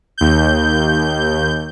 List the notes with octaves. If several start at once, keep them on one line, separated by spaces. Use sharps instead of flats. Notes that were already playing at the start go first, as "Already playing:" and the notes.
D#2 G6